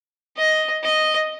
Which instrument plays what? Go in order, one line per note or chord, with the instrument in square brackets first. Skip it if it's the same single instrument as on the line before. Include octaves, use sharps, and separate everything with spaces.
[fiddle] D#5
D#5